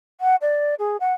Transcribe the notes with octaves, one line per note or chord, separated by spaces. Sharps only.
F#5
D5
G#4
F#5